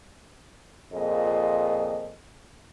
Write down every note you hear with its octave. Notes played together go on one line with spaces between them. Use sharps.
F2 A#2 G#4 D#5